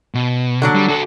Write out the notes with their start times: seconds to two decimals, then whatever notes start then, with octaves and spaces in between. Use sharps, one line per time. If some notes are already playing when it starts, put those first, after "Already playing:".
0.14 B2
0.62 D3 F#3 D4
0.75 G3
0.89 F#4 A4